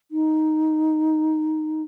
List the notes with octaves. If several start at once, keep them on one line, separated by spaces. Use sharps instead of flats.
D#4